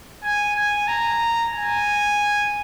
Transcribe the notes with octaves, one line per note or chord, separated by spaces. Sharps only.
G#5
G#5
A#5
G#5